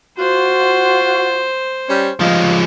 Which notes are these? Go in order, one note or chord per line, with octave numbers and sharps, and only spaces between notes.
F4 F#4 C5
G3 C#4
F3 G3 G#3 D#4 F5